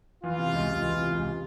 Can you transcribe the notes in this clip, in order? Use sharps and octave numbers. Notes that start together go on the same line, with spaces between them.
E3 F4
C3
C#2
C#2
E3
C3
C#2